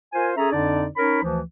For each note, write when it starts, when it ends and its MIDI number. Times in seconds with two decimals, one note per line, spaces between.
0.13 0.30 65
0.13 0.30 70
0.13 0.30 72
0.13 0.30 80
0.36 0.52 61
0.36 0.52 68
0.36 0.52 69
0.36 0.52 76
0.36 0.52 82
0.52 0.85 41
0.52 0.85 50
0.52 0.85 62
0.52 0.85 63
0.52 0.85 74
0.96 1.23 61
0.96 1.23 63
0.96 1.23 70
0.96 1.23 73
0.96 1.23 83
1.23 1.40 38
1.23 1.40 52
1.23 1.40 53